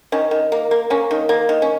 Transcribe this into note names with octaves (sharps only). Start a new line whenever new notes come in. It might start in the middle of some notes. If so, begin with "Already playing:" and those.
D#3 C#4
D#3
A#3
A#3
A#3 C#4
D#3
A#3
D#3
C#4